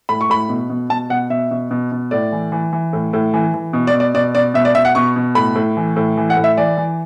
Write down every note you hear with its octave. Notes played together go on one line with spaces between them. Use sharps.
A2 B5
C#6
A2 B5
B2
B2
B2 A5
B2 F#5
B2 E5
B2
B2
B2
A2 D5
E3
E3
E3
A2
A2
E3
E3
B2
D5
B2
D5
B2 D5
B2 D5
B2 E5
D5
B2 E5
F#5
B2 C#6
B2
A2 B5
A2
E3
A2
E3
F#5
A2
E5
E3 D5
E3